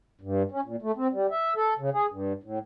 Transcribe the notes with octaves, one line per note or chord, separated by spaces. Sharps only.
G2
C#4
A#2
A3
C4
G3
E5
A4
C#3
G#4
G2
A2